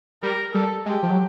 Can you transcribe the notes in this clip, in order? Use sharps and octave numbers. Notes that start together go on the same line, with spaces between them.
G3 A#4
G3 A4
G#3 G4
F3
F#3